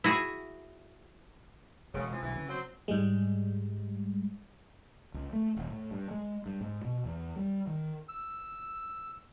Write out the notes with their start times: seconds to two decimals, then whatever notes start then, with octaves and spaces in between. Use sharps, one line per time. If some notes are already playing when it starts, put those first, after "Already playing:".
0.04 E4 F#4 G#4
1.94 E1 C#3 G#3
2.11 C3 E3 F3
2.22 B1 D3 E3
2.35 C#3 C#4
2.48 F#3 C4 C5
2.88 G#2 G3 G#3
5.14 C#2
5.33 A3
5.56 D#1
5.70 A2
5.91 G2
6.11 G#3
6.46 G2
6.61 G#2
6.84 B2
7.05 E2
7.36 G3
7.67 D#3
8.09 E6